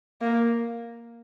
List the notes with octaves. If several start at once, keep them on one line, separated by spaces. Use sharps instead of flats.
A#3